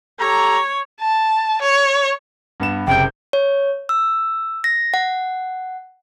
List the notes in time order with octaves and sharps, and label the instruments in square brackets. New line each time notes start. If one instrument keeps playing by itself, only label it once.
[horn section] G4 A4 A#5 [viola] C#5
[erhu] A5
C#5
[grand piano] G2 B3 E7
[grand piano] F#1 C3 G6 [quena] G5
[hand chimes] C#5
E6
A#6
F#5